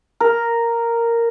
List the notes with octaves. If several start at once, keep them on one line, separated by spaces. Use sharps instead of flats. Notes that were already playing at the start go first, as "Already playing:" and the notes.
A#4